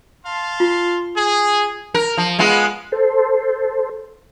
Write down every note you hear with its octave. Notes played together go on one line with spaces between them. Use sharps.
F5 A5 C6
F4
G#4
A#4
F3
G#3 B3 F4
A4 C5